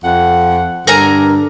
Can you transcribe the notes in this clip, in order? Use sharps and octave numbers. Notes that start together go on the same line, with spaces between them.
F2 F#5
G2 D3 D4 A#4 G#5 A#5